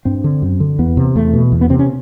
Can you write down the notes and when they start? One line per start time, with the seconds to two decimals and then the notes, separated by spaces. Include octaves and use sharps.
0.05 G2 C4
0.24 D3
0.42 F#2
0.60 D3
0.79 E2 B3
0.97 C3
1.15 E2 A3
1.34 B2
1.52 E2
1.61 B3
1.70 C3 C4
1.79 C#4